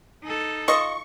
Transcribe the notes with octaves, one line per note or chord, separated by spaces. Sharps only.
D#4 A4
F4 D#5 C#6